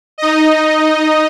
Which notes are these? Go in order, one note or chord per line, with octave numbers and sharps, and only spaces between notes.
D#4 D#5